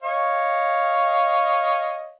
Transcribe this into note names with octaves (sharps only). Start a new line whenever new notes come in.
C#5 D#5 F5